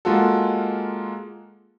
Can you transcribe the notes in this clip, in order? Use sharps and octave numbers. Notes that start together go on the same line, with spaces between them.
G#3 A#3 F4 F#4 A4